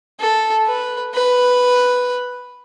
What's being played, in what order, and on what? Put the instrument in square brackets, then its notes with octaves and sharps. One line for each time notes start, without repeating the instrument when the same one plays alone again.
[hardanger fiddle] A4
B4
B4